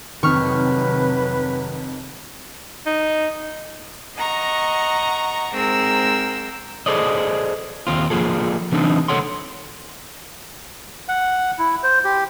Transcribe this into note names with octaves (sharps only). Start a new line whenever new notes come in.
F2 C3 D#3 F#3 B4 C#6 F6
D#4
D#5 F#5 A#5 C#6
G#2 C4 A#4 E6
G#4 A4 C5 D5 D#5
D#2 C4 F4
F3 A#3 F4 G#4 A4
E3 B3 C4 D4 D#4
D2 A3 A4 C#5 F#5 C6
F#5
E4
C5
G4